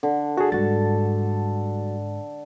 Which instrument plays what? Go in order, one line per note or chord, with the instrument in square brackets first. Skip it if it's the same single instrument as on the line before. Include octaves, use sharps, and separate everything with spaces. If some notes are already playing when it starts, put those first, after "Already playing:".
[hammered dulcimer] D3
[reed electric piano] F#4 G#4 [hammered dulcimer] A4
[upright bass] G#2 [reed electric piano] G3 F#4 A6